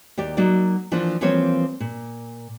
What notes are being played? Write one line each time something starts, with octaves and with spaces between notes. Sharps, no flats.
D#2 G4 D5
F#3 A#3 D#4 D5
E3 F3 A#3 D4
E3 F3 G3 A#3 C4 C#5
A#2